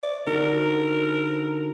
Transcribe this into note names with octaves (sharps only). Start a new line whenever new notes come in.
D5
D3 D#4 F#4 A#4